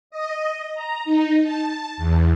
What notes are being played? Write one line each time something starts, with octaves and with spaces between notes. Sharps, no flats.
D#5
A#5
D#4
A5
E2